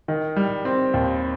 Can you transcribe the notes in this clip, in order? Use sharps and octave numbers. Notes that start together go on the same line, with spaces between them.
D#3
G3
C4
D#2